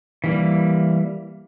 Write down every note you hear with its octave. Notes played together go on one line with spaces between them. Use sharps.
E3 G3 A#3